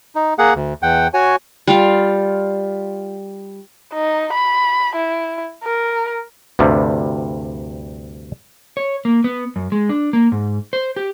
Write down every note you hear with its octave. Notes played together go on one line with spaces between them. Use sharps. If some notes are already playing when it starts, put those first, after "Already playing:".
D#4
A#3 G#4 F#5
D2
E2 F#5 G5
F#4 C#5 G#5
G3 F4 F5
D#4
B5
E4
A#4
D2 G2 C3 G3
C#5
A#3
B3
F#2
G#3
D4
A#3
G#2
C5
G4